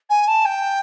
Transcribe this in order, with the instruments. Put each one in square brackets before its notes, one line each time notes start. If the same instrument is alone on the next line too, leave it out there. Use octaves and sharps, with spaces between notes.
[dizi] G#5
A5
G5